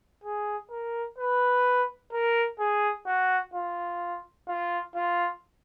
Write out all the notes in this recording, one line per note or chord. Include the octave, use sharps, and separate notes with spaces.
G#4
A#4
B4
A#4
G#4
F#4
F4
F4
F4